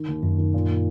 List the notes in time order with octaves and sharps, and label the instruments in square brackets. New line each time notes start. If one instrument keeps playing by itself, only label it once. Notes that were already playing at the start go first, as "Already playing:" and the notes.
Already playing: [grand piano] D#3
D#2
[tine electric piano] F#2 [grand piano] D#3
[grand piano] D#3
A#2
A#2